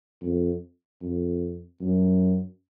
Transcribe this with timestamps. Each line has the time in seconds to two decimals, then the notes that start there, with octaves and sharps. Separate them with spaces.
0.22 F2
1.02 F2
1.81 F#2